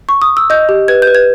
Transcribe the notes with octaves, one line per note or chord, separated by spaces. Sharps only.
C#6
D#6
E6
D#5 G6
G4
B4 G#6
G6
B4
G#6